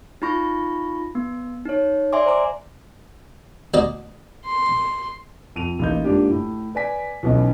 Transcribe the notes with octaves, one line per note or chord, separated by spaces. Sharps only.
D#4 F4 B5 C#6 A#6
B3
D#4 C#5
D5 E5 G#5 C6 D6
C5 A#5 D6
D2 D5 D#5
C6
F2 D#7 F7
A1 A#3 D#4 G6
G#2 A#3 D4 F4 G4
A2
B4 D5 G#5 B6
B1 E3 B3 C#4 D#4 D#5